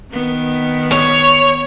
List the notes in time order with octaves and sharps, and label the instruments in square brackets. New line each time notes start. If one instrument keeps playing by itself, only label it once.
[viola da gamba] D#3 B3
[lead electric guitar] C#5